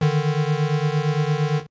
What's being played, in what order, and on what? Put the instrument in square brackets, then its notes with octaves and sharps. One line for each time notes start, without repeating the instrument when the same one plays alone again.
[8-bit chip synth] D3 D#3